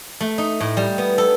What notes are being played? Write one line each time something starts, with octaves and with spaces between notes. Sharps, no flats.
A3
D#4
A2
G3
B3
A4